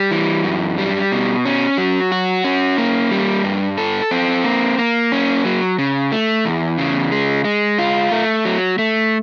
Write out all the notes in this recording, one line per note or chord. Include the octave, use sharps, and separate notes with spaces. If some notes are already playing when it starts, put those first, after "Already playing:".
Already playing: G3
E3
F#2
G3
B2
C#4
F#3
F#4
C#4
A#3
G3
G2
A4
C4
A#3
A#3
C#4
F#3
C#3
A3
E2
C#3
G#3
G#3
F4
A3
F#3
A3